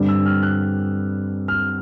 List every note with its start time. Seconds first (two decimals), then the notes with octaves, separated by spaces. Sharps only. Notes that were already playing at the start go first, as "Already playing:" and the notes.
Already playing: G2 D3 G3 C4
0.09 E6
0.26 F6
0.43 F#6
1.48 F6